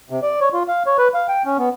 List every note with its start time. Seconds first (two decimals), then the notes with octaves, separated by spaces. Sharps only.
0.10 C3
0.22 D5
0.40 C#5
0.53 F4
0.68 F5
0.86 C#5
0.98 B4
1.14 F5
1.28 G5
1.45 C#4
1.58 B3